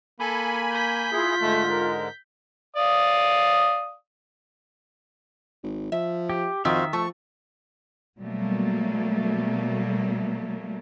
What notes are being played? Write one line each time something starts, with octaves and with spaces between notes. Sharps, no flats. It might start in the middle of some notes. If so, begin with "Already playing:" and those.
A#3 A4 G#5 B5
G6 B6
E4 F4 G#4
G#2 D3 G#3 A3
A#4
D5 F5 D#6
G#1
F3 E5
G4
F2 D#3 F#4 C5 E5 F5
F3 A3 C#6
B2 F#3 G3 A3 A#3